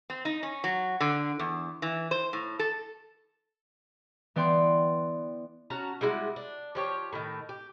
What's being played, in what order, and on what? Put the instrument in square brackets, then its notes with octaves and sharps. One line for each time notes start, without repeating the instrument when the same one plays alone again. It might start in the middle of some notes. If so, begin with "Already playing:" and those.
[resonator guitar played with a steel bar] C4
D#4
C#4
F#3
D3
E2
E3
C5
A2
A4
[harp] E3 B3 D5 G5 C6
[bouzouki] C#4 F#4 A5 A#5
G3 G#3 E4 F#4
D4
F3 G4 C#5
A2 D#3
G4